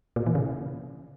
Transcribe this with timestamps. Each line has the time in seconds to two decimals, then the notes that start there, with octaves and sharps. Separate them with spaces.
0.16 A#2
0.26 E3
0.35 C#3